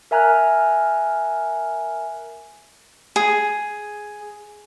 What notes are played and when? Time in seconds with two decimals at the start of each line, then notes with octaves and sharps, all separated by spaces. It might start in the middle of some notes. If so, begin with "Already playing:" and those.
0.11 A#4 E5 G#5 A#5 F6 F#6
3.16 G#4